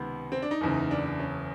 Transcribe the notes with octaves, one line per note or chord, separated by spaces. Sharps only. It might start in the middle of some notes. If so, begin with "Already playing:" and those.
Already playing: C#2 C3 D#3 B3
C4
D4
D#4
F#1 E2 C#3
D4
D4
C#4